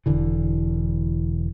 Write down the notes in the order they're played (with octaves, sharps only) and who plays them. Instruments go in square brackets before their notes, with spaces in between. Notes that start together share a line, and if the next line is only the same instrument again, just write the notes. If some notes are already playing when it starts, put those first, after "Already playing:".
[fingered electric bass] E1 D3 E3